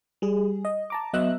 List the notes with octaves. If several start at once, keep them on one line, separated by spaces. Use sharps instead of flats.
G3 G#4
D#5
A5 A#5 D6
F#3 B3 D#5 E5 E6 F#6